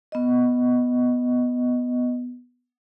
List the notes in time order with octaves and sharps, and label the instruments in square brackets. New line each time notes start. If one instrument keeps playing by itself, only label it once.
[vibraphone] B3 D#5